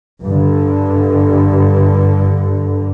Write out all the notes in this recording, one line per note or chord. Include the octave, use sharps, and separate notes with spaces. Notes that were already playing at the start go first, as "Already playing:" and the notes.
G2 D3